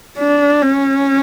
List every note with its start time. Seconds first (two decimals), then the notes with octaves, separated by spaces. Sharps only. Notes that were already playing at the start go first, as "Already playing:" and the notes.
0.19 D4
0.62 C#4